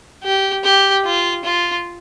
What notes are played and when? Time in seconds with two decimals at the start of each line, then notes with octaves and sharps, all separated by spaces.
0.24 G4
0.64 G4
1.05 F4
1.45 F4